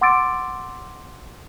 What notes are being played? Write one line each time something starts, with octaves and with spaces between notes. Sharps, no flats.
F#5 C6 D6 E6 A6 D7